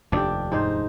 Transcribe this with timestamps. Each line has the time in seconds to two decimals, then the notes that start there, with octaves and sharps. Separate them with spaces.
0.12 F1 D#2 D4 G4
0.52 G#2 D#4 C5